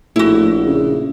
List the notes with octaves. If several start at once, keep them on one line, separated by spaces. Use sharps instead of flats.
A#1 A2 E4 F#4
C#3